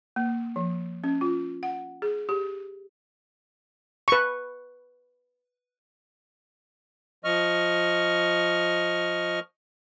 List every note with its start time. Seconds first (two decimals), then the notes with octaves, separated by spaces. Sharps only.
0.16 A#3
0.56 F3
1.04 C#4
1.21 F4
1.63 F#5
2.02 G#4
2.29 G4
4.08 B4 C#6
7.24 F3 D#5 C#6 F6